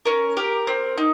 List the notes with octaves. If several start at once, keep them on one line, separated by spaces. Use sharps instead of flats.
C#4 A#4
G4 A#4
C4
D#4